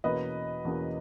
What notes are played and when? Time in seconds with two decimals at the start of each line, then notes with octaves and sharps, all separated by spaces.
0.04 E2 B2 A#3 C#4 B4 D#5
0.65 E2 B2 A#3 C#4